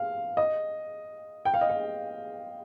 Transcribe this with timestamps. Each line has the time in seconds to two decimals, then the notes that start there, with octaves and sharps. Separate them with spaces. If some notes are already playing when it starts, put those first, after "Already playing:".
Already playing: F5
0.37 D#5
1.45 G5
1.54 F5
1.61 D#5
1.69 F5